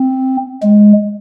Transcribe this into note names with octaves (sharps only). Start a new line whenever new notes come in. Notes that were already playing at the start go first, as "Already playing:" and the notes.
Already playing: C4
G#3